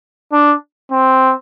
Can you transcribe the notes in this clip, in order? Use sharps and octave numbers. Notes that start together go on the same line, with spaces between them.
D4
C4